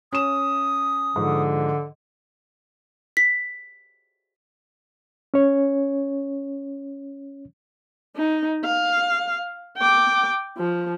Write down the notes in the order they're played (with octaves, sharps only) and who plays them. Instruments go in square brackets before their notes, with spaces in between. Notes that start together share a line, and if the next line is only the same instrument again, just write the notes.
[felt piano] C#4 E7 [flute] D#6
[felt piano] G#2 F3 [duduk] D3
[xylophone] B6
[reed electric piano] C#4 C#5
[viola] D#4
F5
G5 D6
F3